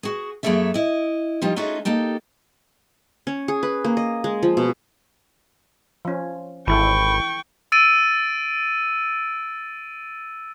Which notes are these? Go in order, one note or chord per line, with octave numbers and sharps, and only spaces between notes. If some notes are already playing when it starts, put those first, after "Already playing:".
F#4 G#4
F#2 A#3 G#4 A4 C#5 E5
E4 D#5
F3 G3 D#4 F4 G4
A3 C#4 D#4 F4 F#4 G#4
A#3 D#4 G4 A4
C#4
G#4
B4
A#3
D#5
G#3
F3
B2
F3 C#4
G#1 E3 E4 A4 G5 B5 C#6
E6 A6 D7 D#7